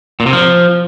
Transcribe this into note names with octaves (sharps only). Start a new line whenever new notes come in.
A#2
C3
F3